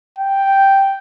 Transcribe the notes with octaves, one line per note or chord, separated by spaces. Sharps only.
G5